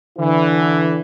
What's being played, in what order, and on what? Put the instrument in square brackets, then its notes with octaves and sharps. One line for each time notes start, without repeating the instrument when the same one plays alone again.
[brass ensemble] D3 E3